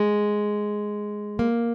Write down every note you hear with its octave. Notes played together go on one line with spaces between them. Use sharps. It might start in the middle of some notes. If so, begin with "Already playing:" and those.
Already playing: G#3
A#3